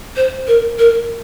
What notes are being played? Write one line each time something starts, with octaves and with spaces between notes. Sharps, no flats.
C5
A#4
A#4